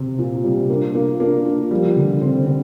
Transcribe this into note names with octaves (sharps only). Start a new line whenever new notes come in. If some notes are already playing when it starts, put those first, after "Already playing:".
Already playing: C3
A#2 F4
C3 G3
A#3 D4
A#3 F4
A#3 D4
F4
F3 G3
D3
D3 C4
D3 C4